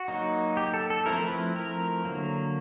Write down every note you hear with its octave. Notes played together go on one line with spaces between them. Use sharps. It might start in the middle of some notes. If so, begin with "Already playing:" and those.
Already playing: F#4
F#3 A#3 D#4
G4
A4
A4
F3 A3 C4 E4 A#4
B4
A#4
D3 F#3 A#3